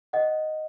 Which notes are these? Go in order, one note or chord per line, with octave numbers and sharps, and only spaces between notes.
D#5 F#5